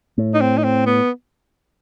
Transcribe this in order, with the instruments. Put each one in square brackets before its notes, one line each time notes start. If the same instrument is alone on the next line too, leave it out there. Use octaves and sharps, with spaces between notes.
[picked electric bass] A2
[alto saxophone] D#4
C4
D#4
C4
B3